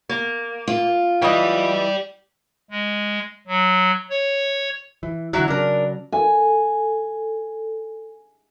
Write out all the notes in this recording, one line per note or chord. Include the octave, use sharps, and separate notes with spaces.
A#3
F4
E3 D5 D#5 G5
G#3
F#3
C#5
E3
D3 E3 F#3 E4 F#4
C#3 F#3 D4 A#4
A4 G#5